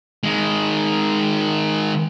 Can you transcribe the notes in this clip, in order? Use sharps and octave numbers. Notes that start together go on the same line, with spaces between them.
D#3 G#3